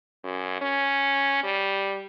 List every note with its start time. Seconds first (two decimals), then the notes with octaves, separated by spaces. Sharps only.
0.24 F#2
0.61 C#4
1.44 G3